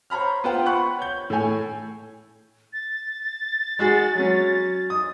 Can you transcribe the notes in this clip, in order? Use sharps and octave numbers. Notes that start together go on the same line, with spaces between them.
C5 C#5 A#5 B5 F6
B3 F4 B4 C5 F#5 G5
F#5 B5 C#6 F#6
C#5 G6
A2 A3 C#5 G#5
A6
G#3 F#4 G#4
F#3 C#4
D#6